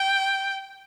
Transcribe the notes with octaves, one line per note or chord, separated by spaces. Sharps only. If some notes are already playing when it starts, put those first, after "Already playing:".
Already playing: G5